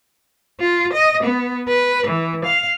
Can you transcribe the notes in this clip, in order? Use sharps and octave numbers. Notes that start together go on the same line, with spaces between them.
F4
D#5
B3
B4
E3
F5